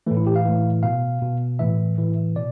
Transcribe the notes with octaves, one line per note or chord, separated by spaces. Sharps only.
A2 E3 A3
E4
G4
F5
A2 E3
B2 F5
B2
A2 E3 E5
A2 E3
B2 D5